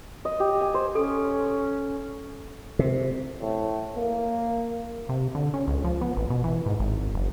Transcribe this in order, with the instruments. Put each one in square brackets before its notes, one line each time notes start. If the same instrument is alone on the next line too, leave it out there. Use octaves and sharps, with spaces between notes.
[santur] D#5
G4
G#5
C5
[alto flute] C#4 [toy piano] A4
[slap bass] C3
[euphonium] A2
A#3
[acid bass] C3
D3
C#4
C#2
F3
B3
A1
B2
E3
G#2
G#1
F#1